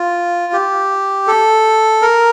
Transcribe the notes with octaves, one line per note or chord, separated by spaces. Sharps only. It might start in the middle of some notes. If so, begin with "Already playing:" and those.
Already playing: F4
G4
A4
A#4